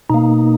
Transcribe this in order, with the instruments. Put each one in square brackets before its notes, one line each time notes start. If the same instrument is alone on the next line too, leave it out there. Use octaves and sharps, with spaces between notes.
[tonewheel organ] B2 A#3 D#4